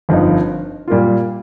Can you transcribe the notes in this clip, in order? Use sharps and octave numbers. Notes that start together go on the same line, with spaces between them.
G1 F2 F3 D#4
A#2 G3 A#3 F4